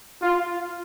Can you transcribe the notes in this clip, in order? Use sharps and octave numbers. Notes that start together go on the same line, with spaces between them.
F4